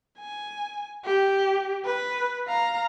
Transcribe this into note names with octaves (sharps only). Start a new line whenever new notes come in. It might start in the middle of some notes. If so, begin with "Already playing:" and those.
G#5
G4
B4
F5 A#5